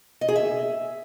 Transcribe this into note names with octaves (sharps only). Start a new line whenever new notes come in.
D#5
G#4
E5